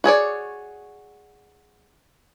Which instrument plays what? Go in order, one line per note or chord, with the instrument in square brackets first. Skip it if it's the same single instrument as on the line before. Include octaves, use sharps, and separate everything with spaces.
[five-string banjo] F#4 G#4 C#5 D5